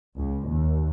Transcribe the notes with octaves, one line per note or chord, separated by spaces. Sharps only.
C#2
D#2